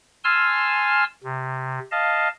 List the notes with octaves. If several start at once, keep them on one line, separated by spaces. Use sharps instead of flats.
G#5 A5 C6 E6 F6
C3
D#5 F5 A5